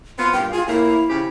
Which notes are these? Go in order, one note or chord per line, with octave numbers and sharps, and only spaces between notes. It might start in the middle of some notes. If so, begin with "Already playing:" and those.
B3 C4 F4 C6
G2 A#2 F4 G5
F4 G#4
A2 A#3 E4
C#3 F3 G4